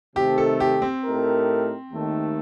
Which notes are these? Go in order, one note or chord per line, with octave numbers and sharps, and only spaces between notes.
C3 D#3 A3 G4
A4
G4
C4
A2 A3 D#4 G4 A#4
D#2 D#3 A3